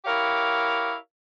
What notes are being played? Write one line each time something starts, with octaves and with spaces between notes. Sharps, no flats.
E4 G4 A#4 C#5 F5